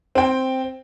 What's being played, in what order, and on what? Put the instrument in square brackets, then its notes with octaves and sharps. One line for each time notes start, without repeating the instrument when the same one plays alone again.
[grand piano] C4 G5